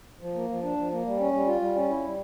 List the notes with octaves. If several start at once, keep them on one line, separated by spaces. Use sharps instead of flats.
F3
A#3
F3
D4
F3
A#3
G3
C#4
G3
F4
G3
C#4
E4
G3